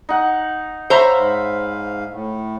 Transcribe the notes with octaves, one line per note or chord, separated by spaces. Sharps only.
D#4 F#5
C5 C#5 E5 A#5 B5
G#2 F5
A2